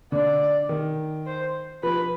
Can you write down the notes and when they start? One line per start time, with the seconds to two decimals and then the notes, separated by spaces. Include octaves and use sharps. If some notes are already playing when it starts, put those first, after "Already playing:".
0.12 D3 D5
0.69 D#3
1.26 C5
1.83 F3 B4